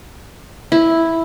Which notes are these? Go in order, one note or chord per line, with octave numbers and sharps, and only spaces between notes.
E4